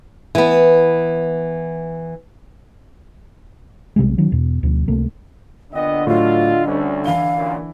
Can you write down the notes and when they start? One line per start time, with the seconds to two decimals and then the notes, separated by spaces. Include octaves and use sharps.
0.35 E3 B3
3.96 B1 C3 G3 G#3
4.18 D#3 F#3 C#4
4.32 E2 B2
4.63 D2 B2 F3
4.88 C#2 C3 A3 A#3
5.73 A#2 D3 B3 D#5 G5
6.07 A2 F#3 F4 D#5
6.66 D2 G3 C#4
7.05 E3 E4 F5 G7
7.37 F#2 A#2